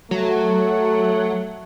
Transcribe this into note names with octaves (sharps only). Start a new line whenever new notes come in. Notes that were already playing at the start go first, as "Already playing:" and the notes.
F#3 A3